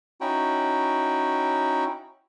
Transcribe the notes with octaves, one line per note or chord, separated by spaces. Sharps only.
C#4 D#4 E4 F#4 G5